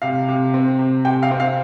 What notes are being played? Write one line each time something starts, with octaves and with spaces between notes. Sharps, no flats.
C3 F5
C3
C4
C3
C3 G5
F5
C4
F5